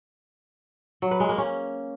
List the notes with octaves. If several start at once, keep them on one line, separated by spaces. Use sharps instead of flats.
F#3
B4
G#3
A#3
C#4